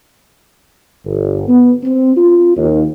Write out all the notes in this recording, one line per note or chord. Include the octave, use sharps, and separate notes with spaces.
G1
B3
C4
F4
D#2